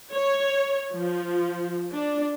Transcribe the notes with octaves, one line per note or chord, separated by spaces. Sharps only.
C#5
F3
D4